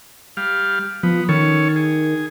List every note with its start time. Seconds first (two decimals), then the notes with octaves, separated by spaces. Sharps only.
0.37 G3 F5
1.03 F3 B3
1.29 D#3 C#4 A4 C#5
1.76 G#4